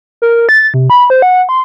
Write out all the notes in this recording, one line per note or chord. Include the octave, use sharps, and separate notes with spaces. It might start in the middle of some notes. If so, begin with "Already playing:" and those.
A#4
A6
C3
B5
C5
F#5
C6